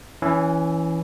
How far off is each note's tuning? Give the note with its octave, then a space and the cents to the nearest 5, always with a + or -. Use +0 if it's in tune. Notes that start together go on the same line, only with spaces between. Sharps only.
E3 +0 C#4 +20